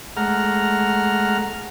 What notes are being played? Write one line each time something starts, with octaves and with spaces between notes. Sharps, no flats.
G#3 A3 F#5 A#5 F6